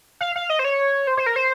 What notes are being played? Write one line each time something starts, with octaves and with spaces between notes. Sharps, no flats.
F5
F5
D#5
C5
C#5
C5
C5
A#4
C5